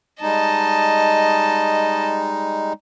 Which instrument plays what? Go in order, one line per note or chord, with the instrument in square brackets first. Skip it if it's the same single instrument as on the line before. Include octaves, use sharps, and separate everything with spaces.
[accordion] G3 G#3 D#4 [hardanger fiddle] D#5 A5